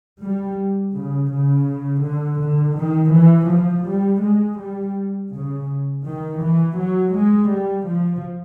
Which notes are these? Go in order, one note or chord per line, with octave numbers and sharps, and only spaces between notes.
G3
C#3
C#3
D3
D3
D#3
E3
F3
G3
G#3
G3
C#3
D#3
E3
F#3
G#3
G3
F3